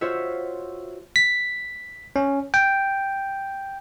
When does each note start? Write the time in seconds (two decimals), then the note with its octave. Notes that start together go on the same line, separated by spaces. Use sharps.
0.01 F4 F#4 C5 C#5 E5
1.16 B6
2.16 C#4
2.54 G5